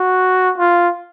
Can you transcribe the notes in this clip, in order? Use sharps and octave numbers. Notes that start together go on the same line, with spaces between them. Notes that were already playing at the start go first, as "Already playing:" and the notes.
Already playing: F#4
F4